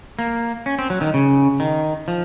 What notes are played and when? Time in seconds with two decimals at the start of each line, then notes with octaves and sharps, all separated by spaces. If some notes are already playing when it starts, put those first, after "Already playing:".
0.19 A#3
0.66 C#4
0.79 C4
0.90 F#3
1.01 D#3
1.14 C#3
1.60 D#3
2.08 F3